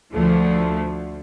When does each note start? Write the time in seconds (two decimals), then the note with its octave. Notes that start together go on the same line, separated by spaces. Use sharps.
0.14 D2 D3 F3 A3